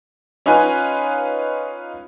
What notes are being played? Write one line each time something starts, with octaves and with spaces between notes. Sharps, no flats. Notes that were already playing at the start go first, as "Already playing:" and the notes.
C#4 D#4 F4 B4 G#5